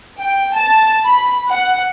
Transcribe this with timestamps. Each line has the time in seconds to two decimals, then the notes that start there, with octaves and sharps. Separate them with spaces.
0.19 G5
0.55 A5
1.06 B5
1.50 F#5